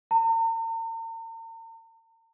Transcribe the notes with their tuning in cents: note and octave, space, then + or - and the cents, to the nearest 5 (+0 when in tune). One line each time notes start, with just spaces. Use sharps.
A#5 -45